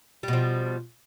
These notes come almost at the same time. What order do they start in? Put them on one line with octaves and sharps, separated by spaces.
G3 B2 F3